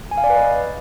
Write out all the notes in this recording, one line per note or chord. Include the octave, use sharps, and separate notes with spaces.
G#5
F5
D5
B4
D#5